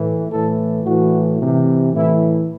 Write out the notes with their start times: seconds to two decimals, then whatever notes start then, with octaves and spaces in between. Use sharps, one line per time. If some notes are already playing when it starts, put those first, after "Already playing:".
Already playing: A2 E3
0.29 A2 E3 A4
0.84 A2 E3 F#4
1.40 C3 E3
1.94 A2 E3 E4